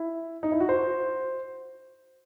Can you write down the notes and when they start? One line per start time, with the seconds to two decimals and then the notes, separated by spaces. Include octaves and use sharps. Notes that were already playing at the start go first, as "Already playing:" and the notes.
Already playing: E4
0.43 D#4
0.52 E4
0.60 F#4
0.69 C5